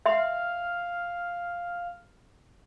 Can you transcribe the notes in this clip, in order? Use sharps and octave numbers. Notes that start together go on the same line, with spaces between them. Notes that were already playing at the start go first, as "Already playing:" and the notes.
E5 F5 C6